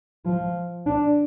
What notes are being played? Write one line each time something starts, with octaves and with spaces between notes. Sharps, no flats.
F3
D4